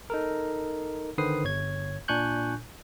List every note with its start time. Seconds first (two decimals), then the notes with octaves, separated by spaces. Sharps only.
0.10 D#4 A4 A#4
1.18 D3 D#3 B4 C5 D#6 C7
1.44 G1 C#5 G#6
2.08 A#2 D4 G#5 C#6 F#6 G6